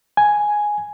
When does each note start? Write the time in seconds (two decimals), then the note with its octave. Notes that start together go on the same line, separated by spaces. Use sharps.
0.17 G#5